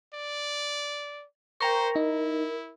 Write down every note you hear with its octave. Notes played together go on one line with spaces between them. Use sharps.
D5
A#4 C5 G5 A#5 C#6
D#4 E4